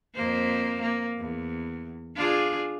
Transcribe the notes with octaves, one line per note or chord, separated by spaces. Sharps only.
F2 A#3 C5
A#3
E2
D4 F4 G#4